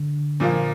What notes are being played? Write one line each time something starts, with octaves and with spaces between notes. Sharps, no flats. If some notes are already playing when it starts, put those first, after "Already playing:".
Already playing: D3
A#2 F3 A#3 F4